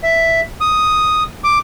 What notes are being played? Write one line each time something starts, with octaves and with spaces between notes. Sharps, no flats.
E5
D#6
D6